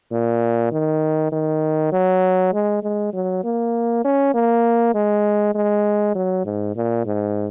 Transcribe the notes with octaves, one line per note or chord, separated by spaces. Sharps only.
A#2
D#3
D#3
F#3
G#3
G#3
F#3
A#3
C#4
A#3
G#3
G#3
F#3
G#2
A#2
G#2